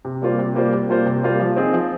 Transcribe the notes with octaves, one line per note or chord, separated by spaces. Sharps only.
C3
G3 A#3 F4 C5
C3
G3 A#3 F4 C5
C3
G3 A#3 F4 C5
C3
G3 A#3 F4 C5
F3
C4 D#4 G#4
F3